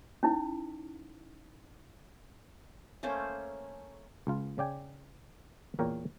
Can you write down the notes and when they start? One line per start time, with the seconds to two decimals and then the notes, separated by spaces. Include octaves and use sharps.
0.23 C#4 D#4 E4
3.03 A3 A#3 C#4 C5
4.27 C#2 F4
4.58 C#3 D5 G5 G#5
5.79 E2 A#2 A#4 C#5 G5